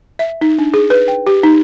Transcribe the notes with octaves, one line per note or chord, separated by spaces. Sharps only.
E5
D#4
D4
G#4
B4
G5
G4
D#4